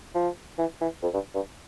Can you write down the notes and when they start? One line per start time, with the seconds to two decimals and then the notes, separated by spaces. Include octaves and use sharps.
0.15 F3
0.59 E3
0.81 E3
1.03 F2
1.14 G2
1.35 G2